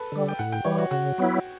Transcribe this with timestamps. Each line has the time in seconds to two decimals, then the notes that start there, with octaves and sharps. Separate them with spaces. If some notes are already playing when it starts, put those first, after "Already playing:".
Already playing: A4 B4
0.12 D3 G3
0.28 G5
0.39 A2 F#5
0.52 G5
0.65 E3 G3 C#5
0.78 F#4
0.91 C#3 F#4
1.18 F#3 B3 E4